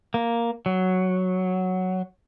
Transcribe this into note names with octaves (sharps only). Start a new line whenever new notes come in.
A#3
F#3